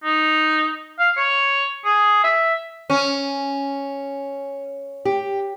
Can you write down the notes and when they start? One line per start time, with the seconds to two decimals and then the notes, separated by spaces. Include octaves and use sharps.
0.04 D#4
0.99 F5
1.17 C#5
1.85 G#4
2.24 E5
2.90 C#4
5.05 G4